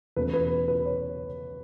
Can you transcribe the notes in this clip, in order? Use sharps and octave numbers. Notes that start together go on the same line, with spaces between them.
E2 B2 A3 C#4 B4
B4
B4
B4
C#5